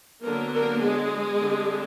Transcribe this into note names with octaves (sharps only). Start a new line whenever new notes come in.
D3 F#3 A#3 B3 D4 A#4
A#3 A#4
G#3 G#4
D3 G3 C4